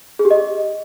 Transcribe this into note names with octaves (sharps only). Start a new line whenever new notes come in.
G#4
G4
D#5